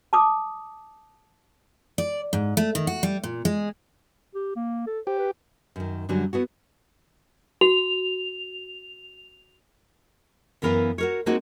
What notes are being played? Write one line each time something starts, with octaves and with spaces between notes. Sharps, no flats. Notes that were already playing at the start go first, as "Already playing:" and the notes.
A5 D6 D#6
D5
G#2
A3
D#3
F#4
G3
A#2
G#3
G4
A#3
A4
G4 C5
B4
F#2 D#3
F#2 D3 F#3 G3 C#4
B3 E4 F#4
F#4 F7
F#2 E3 B3 A#4 B4 F5
F#4 A#4 C#5
G#3 A#3 C4 D#4 F#4 G#4